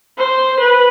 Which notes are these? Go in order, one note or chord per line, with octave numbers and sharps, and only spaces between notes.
C5
B4